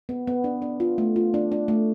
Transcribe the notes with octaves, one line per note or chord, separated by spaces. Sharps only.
B3
B3
D4
D4
F4
A3
F4
D4
D4
A3